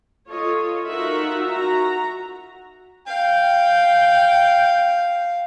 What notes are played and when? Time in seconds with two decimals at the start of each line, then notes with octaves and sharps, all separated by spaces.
0.30 F4 A4 C#5 D#5
0.88 D#4 F4 F#4 A#4 E5 F#5
1.49 F#4 A#5
3.07 F5 G5